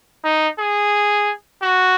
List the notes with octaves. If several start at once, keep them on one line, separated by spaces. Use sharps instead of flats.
D#4
G#4
F#4